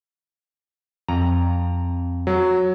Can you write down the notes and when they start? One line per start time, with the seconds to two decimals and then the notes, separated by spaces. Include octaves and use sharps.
1.08 F2 A#5
2.27 F#3